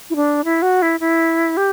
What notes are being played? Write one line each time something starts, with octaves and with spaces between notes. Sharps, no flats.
E4
D4
E4
F#4
E4
E4
G4